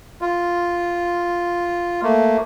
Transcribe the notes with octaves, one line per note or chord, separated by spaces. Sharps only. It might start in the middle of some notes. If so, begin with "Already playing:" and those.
F4
A3 A#3